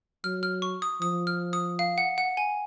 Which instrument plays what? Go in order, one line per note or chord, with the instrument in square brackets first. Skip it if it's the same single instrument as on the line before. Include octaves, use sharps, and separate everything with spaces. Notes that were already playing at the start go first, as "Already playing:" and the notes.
[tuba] F#3 [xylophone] F6
[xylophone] F6
C#6
D#6
[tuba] F3 [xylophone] D#6
[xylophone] F6
D#6
F5
F#5
F#5
G#5